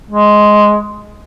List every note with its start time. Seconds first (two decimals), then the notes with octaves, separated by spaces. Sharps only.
0.11 G#3